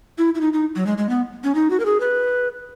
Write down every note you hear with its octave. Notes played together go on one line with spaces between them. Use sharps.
E4
E4
D#4
D#4
F#3
G#3
G#3
B3
C#4
D#4
F#4
A#4
G#4
B4